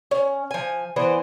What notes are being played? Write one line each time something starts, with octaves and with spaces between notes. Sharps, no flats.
C#4
F3 G#5
E3 B3 C5 D5